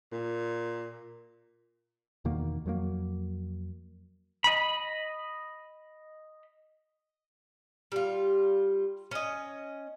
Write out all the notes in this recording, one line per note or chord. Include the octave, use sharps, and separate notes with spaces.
A#2
E2 B2 D#3 A#3
F2 F#3 A3 A#3
D#5 B5
G3 F4
C#4 D#5